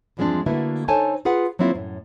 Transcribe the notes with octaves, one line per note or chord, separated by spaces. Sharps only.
E2 G2 F3 G#3 C4 D4
D3 A3 A#3 E4 F#4 B4
D#4 A4 C5 C#5 G#5 A5
F4 G#4 B4 F#5
F#3 A#3 C4 E4 F4
F#2 A2